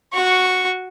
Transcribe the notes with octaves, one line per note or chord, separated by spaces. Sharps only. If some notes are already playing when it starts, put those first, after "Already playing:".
F#4 C#6